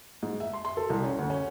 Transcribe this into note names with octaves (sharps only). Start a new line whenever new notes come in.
G#2
E5
C6
C6
A4
C2
C#4
D2
C#4